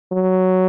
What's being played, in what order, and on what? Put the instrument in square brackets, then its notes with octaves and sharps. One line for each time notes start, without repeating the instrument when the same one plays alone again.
[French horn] F#3